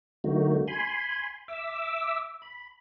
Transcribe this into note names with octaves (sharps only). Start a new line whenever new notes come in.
D3 F#3 A3 A#3 D#4 F#4
G#5 B5 C6
E5 D6 E6
B5